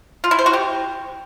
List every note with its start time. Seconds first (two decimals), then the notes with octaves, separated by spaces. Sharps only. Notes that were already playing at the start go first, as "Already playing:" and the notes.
0.24 F4
0.31 E4
0.39 C5
0.46 F#4
0.53 G4